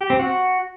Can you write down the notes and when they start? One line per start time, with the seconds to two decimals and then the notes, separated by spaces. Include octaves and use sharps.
0.01 G4
0.10 C4
0.19 F#4